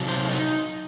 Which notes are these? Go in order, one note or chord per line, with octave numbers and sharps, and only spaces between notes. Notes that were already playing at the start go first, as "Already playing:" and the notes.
Already playing: C3 F#3
C5
D#4